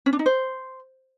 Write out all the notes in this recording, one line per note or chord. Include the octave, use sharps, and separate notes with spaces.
C#4
D4
D#4
C5